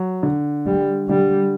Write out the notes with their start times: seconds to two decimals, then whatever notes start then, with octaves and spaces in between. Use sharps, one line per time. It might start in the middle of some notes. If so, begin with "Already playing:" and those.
Already playing: F#3
0.23 D3
0.66 G3
1.09 D3 G3